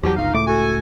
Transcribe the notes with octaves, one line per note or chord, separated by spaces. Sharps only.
E2 F3 F#3 G4
G1 C#2 D#4 F5
C#2 A2 A3 D6
F#4 A4 G#5